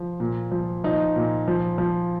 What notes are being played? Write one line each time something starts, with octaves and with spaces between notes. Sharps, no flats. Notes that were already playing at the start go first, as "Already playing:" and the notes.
Already playing: F3
A#2
F3
F3 D#4
A#2
F3
F3